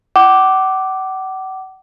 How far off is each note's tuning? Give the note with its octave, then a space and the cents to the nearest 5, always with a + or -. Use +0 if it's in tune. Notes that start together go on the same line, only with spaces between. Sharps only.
F#5 +40 D6 +0